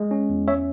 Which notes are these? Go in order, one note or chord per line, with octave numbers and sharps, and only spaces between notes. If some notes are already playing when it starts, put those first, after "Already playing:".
Already playing: G#3
C#4
E2
C#4 C#5 E5